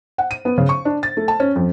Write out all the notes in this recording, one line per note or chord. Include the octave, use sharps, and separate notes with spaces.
F#5
D#7
B3
C#3
C#6
D4
A6
A3
A5
C#4
F2